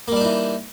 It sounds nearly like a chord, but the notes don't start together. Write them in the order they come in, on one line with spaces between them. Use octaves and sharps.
A#3 G3 D4 D#4 E3